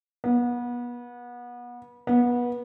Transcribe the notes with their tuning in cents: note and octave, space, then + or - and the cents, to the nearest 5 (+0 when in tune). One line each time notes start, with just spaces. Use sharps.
B3 -30
B3 -25